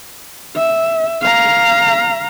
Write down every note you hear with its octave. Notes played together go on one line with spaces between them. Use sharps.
E5
F5 A#5